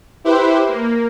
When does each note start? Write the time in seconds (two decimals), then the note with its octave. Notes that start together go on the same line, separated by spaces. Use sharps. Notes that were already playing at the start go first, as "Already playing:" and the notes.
0.24 E4 G4 B4 C5
0.69 A#3